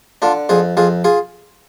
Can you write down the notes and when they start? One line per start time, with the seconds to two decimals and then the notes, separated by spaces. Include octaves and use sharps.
0.22 D3 D4 F4
0.49 F2 F4 G#4
0.77 F2 F4 G#4
1.04 F4 G#4